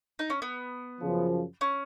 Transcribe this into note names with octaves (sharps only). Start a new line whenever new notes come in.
D#4
C#4
B3
F#2 C#3 F3
C#4